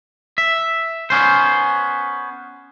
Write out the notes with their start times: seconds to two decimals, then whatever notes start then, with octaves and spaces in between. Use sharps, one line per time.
0.38 E5
1.10 B3 C#4 C5